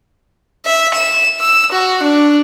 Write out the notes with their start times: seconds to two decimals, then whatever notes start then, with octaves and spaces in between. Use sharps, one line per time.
0.66 E5
0.94 E7
1.41 E6
1.72 F#4
2.03 D4